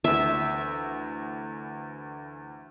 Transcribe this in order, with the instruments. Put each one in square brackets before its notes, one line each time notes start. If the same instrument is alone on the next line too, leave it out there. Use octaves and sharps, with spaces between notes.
[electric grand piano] D2 E3 [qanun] E5